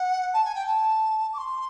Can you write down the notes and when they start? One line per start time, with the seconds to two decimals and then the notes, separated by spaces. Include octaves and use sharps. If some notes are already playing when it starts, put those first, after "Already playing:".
Already playing: F#5
0.33 A5
0.45 G#5
0.55 G5
0.67 A5
1.33 D6
1.38 C6